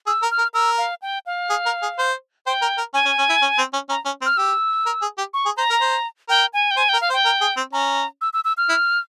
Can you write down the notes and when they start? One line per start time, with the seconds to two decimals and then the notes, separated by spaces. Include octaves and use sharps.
0.06 G#4 E6
0.22 A#4
0.31 F6
0.38 A#4
0.54 A#4 E6
0.78 F5
1.02 G5
1.26 F5
1.50 G#4
1.66 A#4
1.82 G#4
1.98 C5
2.46 C5 G5
2.62 A#4
2.78 A#4
2.94 C#4 G#5
3.05 C#4
3.18 C#4
3.29 E4
3.42 C#4
3.58 C4
3.73 C#4
3.89 C#4 A#5
4.06 C#4
4.21 C4
4.26 F6
4.37 G4 E6
4.86 A#4
5.02 G#4
5.18 G4
5.34 C#6
5.45 G#4
5.57 C5 A#5
5.70 A#4
5.81 C5
6.29 A#4 G5
6.53 G#5
6.71 G5
6.77 C5 G#5
6.89 G5
6.94 A#4
7.01 F5
7.10 C5
7.13 G5
7.25 A#4
7.41 G#4
7.57 C4
7.73 C#4 A#5
8.21 E6
8.33 E6
8.45 E6
8.57 F6
8.69 E4